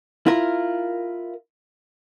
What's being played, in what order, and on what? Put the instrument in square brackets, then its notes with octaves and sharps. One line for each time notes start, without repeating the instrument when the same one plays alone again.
[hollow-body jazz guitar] E4 F4 A#4